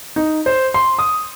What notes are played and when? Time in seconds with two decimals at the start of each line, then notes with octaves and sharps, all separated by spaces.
0.16 D#4
0.46 C5
0.74 C6
0.99 D#6